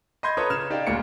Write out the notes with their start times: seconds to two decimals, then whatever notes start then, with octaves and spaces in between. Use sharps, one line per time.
0.23 D#5 B5 C6 G6 G#6
0.37 F4 A4 B4 C#5 A#5 D#6
0.50 C#3 F6 G#6 E7
0.70 D#4 G4 D5 F5
0.87 G1 D2 A#2 G#3 C#7